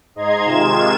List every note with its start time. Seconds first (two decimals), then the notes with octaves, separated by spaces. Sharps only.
0.15 G#2 D#5 A#5 C6 G#6
0.45 C3 D#3 G#3 F4 G#6 E7